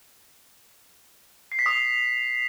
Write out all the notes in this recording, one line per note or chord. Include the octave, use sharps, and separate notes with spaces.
C7
B6
D#6
C7